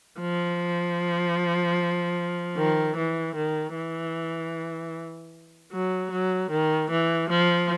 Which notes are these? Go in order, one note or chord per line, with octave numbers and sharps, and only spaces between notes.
F3
D#3
E3
D#3
E3
F#3
F#3
D#3
E3
F3